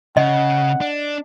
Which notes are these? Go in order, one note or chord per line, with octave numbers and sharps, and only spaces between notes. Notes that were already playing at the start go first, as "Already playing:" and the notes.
C#3 D#5 F#5
D4